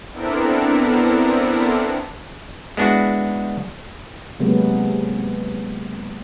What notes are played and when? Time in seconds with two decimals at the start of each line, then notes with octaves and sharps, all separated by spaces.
0.11 B3 C4 D4 E4 A4 A#4
2.77 G#3 B3 D4 E4 F#4
4.39 C3 F#3 G#3 A#3 B3